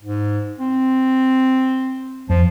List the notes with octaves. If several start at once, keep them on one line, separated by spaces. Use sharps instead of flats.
G#2
C4
F2 F3